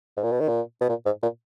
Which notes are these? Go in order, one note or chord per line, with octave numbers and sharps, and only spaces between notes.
G#2
A#2
B2
D#3
A#2
B2
A#2
G#2
A#2